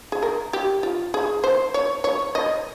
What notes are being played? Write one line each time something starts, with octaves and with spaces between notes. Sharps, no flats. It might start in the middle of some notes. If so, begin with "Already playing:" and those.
G#4
A#4
G4
F4
G#4
C5
C#5
C#5
D#5